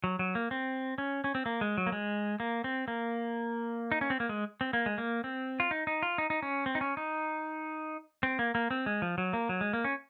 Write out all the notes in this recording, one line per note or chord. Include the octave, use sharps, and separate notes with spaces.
F#3
F#3
A#3
C4
C#4
C#4
C4
A#3
G#3
F#3
A#3
G#3
A#3
C4
A#3
D#4
C#4
C4
A#3
G#3
C4
A#3
G#3
A#3
C4
F4
D#4
D#4
F4
D#4
D#4
C#4
C4
D#4
C#4
D#4
C4
A#3
A#3
C4
G#3
F3
F#3
A#3
F#3
G#3
A#3
C#4